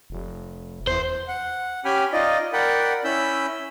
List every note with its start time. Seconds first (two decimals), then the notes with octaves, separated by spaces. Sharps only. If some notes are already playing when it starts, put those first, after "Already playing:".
0.10 F1
0.87 E2 C5
1.28 F#5
1.85 C#4 G4 G5 G#5 B5 F6
2.13 D#4 F4 D5 D#5
2.53 A#4 D5 F#5 G5 B5
3.04 C#4 E4 B5 E6 G6